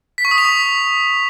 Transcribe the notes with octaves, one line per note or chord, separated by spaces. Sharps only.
B6
C#6
D#6
F7
B6